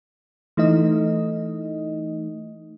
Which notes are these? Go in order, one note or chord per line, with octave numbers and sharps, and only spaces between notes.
E3 A3 D#4 D#5